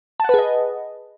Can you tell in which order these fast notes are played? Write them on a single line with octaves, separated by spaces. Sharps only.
A5 F#5 B4 G#4 D#5